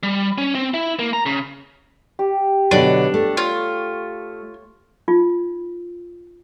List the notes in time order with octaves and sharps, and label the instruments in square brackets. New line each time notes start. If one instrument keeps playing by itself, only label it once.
[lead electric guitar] G3
C#4
C4
E4
A#3
A#5
C#3
[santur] G4
[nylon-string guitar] B2 D3 F#3 [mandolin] D4
[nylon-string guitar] A3
[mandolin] F4 [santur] C#5
[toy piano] D#4 F4